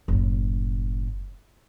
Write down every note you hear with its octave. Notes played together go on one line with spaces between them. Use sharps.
F#1 A2